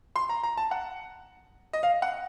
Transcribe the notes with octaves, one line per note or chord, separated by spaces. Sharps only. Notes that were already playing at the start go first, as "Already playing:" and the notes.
C6
A#5
A#5
A5
F#5
D#5
F5
F#5